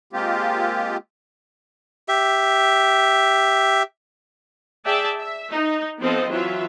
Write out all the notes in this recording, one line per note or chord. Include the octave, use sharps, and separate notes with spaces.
G#3 A#3 C4 F4 G4
G4 E5
G#4 D5 E5 G5 A5
E5
D#4
F3 B3 C4 A4 C5 D#5
E3 F#3 F4 E5